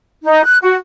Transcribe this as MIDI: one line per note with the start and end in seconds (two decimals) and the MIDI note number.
0.24 0.44 63
0.45 0.56 90
0.62 0.76 66